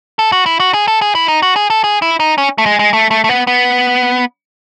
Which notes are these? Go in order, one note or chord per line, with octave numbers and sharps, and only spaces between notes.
A4
F#4
E4
F#4
G#4
A4
G#4
E4
D#4
F#4
G#4
A4
G#4
E4
D#4
C#4
A3
G#3
G#3
A3
A3
A3
B3
B3